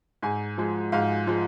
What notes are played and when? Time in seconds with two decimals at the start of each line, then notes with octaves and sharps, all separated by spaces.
0.23 G#2 G#5
0.58 F3 G#3
0.92 G#2 F5
1.27 F3 G#3